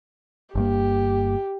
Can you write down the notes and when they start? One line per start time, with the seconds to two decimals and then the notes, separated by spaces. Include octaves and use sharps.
0.55 G1 G2 A#3 G4